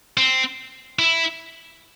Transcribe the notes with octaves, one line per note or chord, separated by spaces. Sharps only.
C4
E4